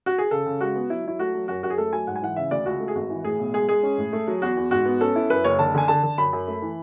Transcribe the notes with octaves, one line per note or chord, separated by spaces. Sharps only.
F#4
G#4
C#3 A4
C#3
G#3 F#4
B3
F#3 E4
F#3 E4
A3 F#4
F#3
F#2 F#4
F#2 F#4
G#4
A3 A4
F#3 G#5
G#2 F#5
G#5
E3 F#5
C#3 E5
D2 D5
C#2 F#4
A3
G#4
G#1 F#4
E3
A2 G#4
B1
G#3 G#4
G#3 G#4
C#4
A2
A3
F#3
E2 F#4
E2
G#2 F#4
B3
C#4 A4
E4
F#2 B4
F#1 C#5
D3 A5
D3 G#5
D3 A5
D3
F#2 B5
F#2
A3
E3